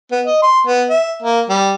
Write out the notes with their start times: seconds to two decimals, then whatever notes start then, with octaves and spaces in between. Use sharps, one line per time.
0.12 B3
0.26 D#5
0.42 C6
0.66 B3
0.89 E5
1.22 A#3
1.49 G3